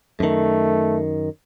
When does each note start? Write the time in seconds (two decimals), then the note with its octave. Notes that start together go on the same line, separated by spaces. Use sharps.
0.20 F#2 D#3 A3